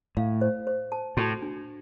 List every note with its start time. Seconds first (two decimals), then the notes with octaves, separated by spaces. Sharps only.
0.17 A2 F5
0.41 C5
0.67 C5
0.92 A5
1.17 A2 F#4
1.42 D4